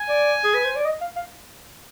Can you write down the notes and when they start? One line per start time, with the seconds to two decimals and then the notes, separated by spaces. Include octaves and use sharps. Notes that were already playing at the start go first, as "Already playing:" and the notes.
Already playing: G#5
0.09 D5
0.44 G#4
0.54 B4
0.65 C5
0.76 D5
0.85 D#5
1.01 F5
1.16 F5